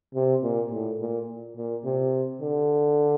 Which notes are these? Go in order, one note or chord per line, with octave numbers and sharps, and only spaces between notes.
C3
A#2
A2
A#2
A#2
C3
D3